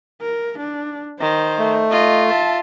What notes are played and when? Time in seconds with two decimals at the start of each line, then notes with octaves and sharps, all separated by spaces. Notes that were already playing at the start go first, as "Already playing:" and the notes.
0.22 A#4
0.59 D4
1.20 D#3 C5
1.59 A3
1.91 F4 D#5
2.29 E5 A5